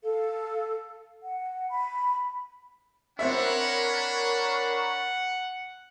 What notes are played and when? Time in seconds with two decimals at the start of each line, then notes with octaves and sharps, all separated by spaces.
0.03 A4 F5
1.21 F#5
1.70 B5
3.19 C4 D4 A#4 C#5 E5 F#5 B5